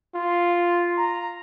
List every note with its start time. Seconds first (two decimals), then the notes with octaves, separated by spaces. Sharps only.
0.15 F4
0.98 A#5